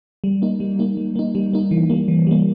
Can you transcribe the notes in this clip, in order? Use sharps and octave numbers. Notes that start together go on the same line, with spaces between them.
G3
A#3 D#4
G3
A#3 D#4
G3
A#3 D#4
G3
A#3 D#4
E3
G3 A#3
E3
G3 A#3